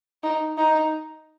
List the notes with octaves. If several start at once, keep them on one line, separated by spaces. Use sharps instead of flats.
D#4
D#4